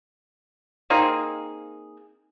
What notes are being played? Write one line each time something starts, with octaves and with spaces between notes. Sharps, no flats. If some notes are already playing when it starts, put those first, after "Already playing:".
A#3 C4 D#4 G#4